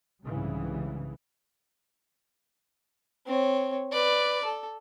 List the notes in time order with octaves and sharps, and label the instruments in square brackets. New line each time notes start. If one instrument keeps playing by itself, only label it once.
[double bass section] C2 G#2 C#3 E3 G3
[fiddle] C4 C#5
B4 D5
A4